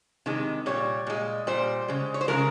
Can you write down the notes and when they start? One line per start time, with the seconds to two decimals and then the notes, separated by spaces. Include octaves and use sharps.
0.26 C3 D#3 G#3
0.66 A#2 G3 C#5
1.07 A#2 G#3
1.47 A#2 G3 C5
1.88 C#3 G#3
2.14 C#5
2.21 C5
2.28 F3 G#3 A#4
2.33 C#3